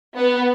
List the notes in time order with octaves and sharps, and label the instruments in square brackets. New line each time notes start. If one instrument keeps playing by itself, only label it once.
[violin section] B3